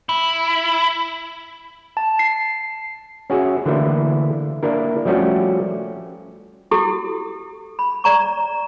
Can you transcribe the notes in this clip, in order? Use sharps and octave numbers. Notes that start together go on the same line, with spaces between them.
E4
A5
C7
C#4 F#4 G#4 E5
D3 E3 A3 A#3 E4
A#3 D4 E4 A#4
F3 G3 A3 C#4 F#4 G4
E4 F#4 G4 A4
B5
D5 A#5 C#6